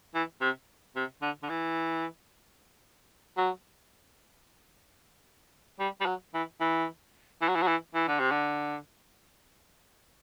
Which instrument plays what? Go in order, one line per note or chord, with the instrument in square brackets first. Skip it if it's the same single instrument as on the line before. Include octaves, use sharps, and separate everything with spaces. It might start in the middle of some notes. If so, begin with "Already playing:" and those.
[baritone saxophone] E3
C3
C3
D3
D3
E3
F#3
G3
G3
F#3
E3
E3
E3
F#3
E3
F#3
E3
E3
D3
C3
D3